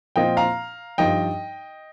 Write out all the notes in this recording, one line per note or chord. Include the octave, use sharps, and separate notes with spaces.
A#2 F3 C4 F4 D#5 G5
F5 A#5
G2 F3 D#4 D#5 G5